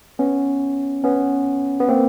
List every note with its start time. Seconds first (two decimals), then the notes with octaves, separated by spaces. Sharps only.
0.19 B3 C#4
1.04 B3 C#4
1.80 B3
1.89 A#3 C4